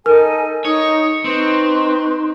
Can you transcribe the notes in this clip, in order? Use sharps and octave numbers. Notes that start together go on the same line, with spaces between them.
D#4 A4 A#4 G#5
D#4 C#5 D#6
C4 D#4 B4 C6 C#6